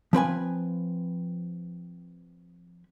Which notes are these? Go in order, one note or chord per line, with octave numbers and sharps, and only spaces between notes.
F3 C4 B4 G#5